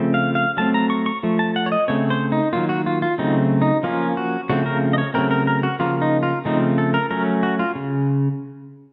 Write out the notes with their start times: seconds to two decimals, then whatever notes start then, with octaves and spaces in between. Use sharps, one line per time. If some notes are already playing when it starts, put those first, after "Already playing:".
Already playing: C#3 F3 A3 C4
0.14 F5
0.35 F5
0.57 F#3 A3 C4 A5
0.74 A#5
0.90 C#6
1.06 C#6
1.23 F3 A3
1.39 A5
1.56 F#5
1.66 C#5
1.72 D#5
1.88 C#3 A3 C4 C#5
2.10 C5
2.32 D#4
2.53 D#3 F#3 A#3 F4
2.69 F#4
2.86 F4
3.02 F4
3.18 C#3 F#3 A3 C4 D#4
3.62 D#4
3.83 F3 A#3 C#4 F4
4.17 F#4
4.50 C#3 F3 A3 C4 F#4
4.66 A#4
4.93 D#5
4.98 C#5
5.14 C#3 F#3 A3 C4 A#4
5.31 A#4
5.47 A#4
5.63 F#4
5.79 C#3 F3 A#3 F4
6.02 D#4
6.23 F4
6.45 C#3 F3 A3 C4 D#4
6.78 A4
6.94 A#4
7.11 F#3 A3 C#4 A#4
7.43 F#4
7.59 F4
7.75 C#3